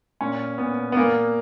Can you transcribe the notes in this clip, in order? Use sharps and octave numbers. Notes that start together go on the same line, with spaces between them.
A#2 C#4
A#2 B3
B3
A#2 A#3